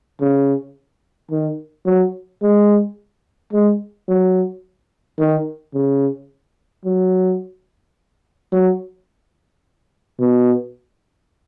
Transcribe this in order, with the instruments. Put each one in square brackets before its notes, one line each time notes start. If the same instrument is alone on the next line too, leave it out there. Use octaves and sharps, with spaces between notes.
[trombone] C#3
D#3
F#3
G#3
G#3
F#3
D#3
C#3
F#3
F#3
B2